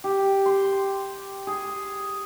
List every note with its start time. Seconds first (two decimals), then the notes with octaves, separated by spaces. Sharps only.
0.04 G4
0.46 C6
1.47 G#4